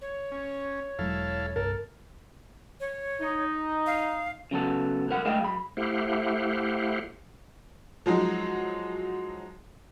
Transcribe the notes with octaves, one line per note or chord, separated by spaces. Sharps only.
C#5
C#4
E1 F#3 G#3 E4 A4 F5
G1 C2 A4 A#4
C#5
D#4
F5
C#3 F#3 B3 A4
B1 G#2 A#4 F#5
G#3 A3 G#4 D#5 F5 G5
F#2 B5
A3 E4 G4 C5 F5 F#5
F3 F#3 G#3 D#4